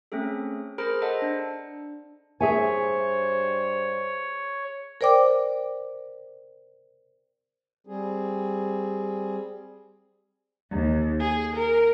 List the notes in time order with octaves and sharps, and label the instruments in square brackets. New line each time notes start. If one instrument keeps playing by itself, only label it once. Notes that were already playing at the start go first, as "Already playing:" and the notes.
[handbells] A3 C4 C#4 G#4 A4
G#4 A#4 C5 A#5 B5 F6
A4 C5 D#5 F#5 A5 A#5
D4
[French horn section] G2 C5 [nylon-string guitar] G#4 E5 G#5 [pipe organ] C#5
[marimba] A#4 C5 D5 G5 D6
[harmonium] G3 C4 G#4
[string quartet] D#2
G#4
A#4